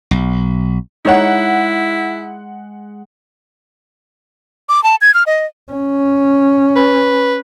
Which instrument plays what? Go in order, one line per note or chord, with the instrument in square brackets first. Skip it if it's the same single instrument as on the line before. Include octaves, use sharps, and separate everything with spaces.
[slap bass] B1
[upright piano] G#3 F#5 [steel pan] D#4 C#5 [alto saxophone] E4
[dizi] D6
A5
G#6
F6
D#5
[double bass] C#4
[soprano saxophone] B4